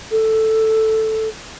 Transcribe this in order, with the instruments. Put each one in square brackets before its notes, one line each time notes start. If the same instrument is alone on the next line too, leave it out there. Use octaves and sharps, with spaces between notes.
[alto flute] A4